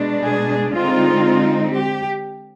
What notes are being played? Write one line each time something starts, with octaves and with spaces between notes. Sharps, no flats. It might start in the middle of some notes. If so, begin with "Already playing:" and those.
Already playing: B2 G#3 D4
G#4
D3 G#3 C4 D#4 F4
G4